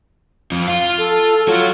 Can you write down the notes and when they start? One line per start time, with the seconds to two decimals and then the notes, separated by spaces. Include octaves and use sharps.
0.51 F2 F3
0.68 F4 F5
0.98 A4
1.48 F4 F#4 C#5